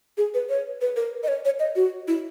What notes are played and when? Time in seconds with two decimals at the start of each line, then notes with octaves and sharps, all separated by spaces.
0.17 G#4
0.34 B4
0.49 C#5
0.81 B4
0.96 A#4
1.23 D#5
1.28 C#5
1.45 C#5
1.60 D#5
1.76 F#4
2.08 E4